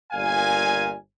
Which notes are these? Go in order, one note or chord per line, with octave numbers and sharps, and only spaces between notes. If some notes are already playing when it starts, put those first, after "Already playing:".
G1 A#2 A#4 F5 G#5